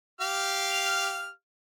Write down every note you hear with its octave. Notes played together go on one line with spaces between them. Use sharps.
G4 F5 F6